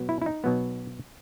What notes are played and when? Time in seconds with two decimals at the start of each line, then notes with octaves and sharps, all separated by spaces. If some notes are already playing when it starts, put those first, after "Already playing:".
Already playing: B2 F#3 B3
0.09 E4
0.22 E4
0.26 D#4
0.44 B2 F#3 B3